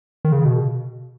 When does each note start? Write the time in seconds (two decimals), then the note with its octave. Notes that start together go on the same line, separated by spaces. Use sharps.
0.25 D#3
0.32 C#3
0.45 B2